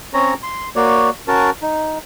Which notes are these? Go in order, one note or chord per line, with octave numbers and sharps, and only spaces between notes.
C4 C#4 C#5 A#5
C6
A#3 F#4 C#5 D5
C#4 F#4 A#4 A5
D#4